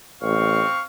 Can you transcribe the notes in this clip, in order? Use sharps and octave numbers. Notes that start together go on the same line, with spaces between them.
A1 C4 F5 C#6